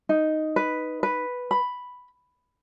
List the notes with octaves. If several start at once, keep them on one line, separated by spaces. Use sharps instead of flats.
D#4
B4
B4
B5